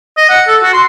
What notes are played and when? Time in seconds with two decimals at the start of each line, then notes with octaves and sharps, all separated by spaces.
0.17 D#5
0.30 F#5
0.48 A4
0.62 F#4
0.74 C6